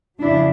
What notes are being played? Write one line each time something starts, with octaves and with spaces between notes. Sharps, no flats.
F2 C#3 F#3 D4 E4